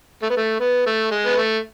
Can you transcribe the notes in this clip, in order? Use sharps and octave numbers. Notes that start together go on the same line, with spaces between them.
A3
B3
A3
B3
A3
G#3
B3
A3